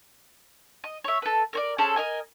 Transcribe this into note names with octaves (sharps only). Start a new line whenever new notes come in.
D#5
C#5 E5
A4 B4
A#4 C#5 D5
C#4 G#4 A4 C5
A#4 D#5 G#5